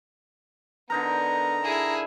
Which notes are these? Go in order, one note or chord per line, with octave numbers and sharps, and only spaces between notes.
D3 B3 D#4 A#4 A#5
E4 G#4